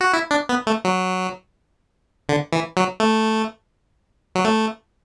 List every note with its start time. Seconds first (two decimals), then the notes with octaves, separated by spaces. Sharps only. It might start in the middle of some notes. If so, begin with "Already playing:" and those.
0.01 F#4
0.14 E4
0.31 D4
0.49 B3
0.67 A3
0.85 F#3
2.29 D3
2.53 E3
2.77 F#3
3.00 A3
4.35 F#3
4.45 A3